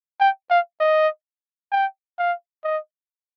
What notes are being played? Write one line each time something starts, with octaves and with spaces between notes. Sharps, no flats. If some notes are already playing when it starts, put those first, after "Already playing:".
G5
F5
D#5
G5
F5
D#5